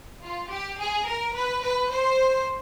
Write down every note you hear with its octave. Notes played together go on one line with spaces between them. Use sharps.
F4
G4
G#4
A#4
B4
B4
C5